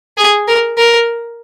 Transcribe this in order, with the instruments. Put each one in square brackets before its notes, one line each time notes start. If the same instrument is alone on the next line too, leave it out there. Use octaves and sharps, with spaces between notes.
[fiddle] G#4
A#4
A#4